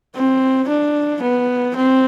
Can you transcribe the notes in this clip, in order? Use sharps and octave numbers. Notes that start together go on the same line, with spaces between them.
C4
D4
B3
C4